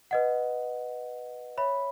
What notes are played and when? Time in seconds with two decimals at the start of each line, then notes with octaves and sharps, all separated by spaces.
0.11 B4 D#5 F#5
1.57 C#5 E5 B5